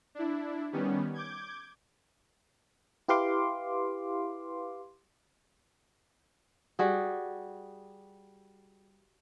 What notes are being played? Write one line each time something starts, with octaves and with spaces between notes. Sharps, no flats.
D4 E4
D#3 G3 B3 C#4
D6 G6 G#6
E4 G4 B4 F5 C6 D6
G3 F#4 G#4